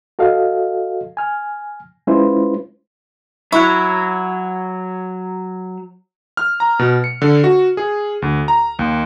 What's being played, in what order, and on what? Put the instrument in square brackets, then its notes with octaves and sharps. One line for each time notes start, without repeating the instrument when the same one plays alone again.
[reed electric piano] F#4 A4 D#5 F5
G#5 F6
G#3 C#4 E4 F4 B4 C5
[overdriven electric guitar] F#3 [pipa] E4 [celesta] C#6 F#6
[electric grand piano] F6
A#5
B2
C#7
D3
F#4
G#4
D2
A#5
D#2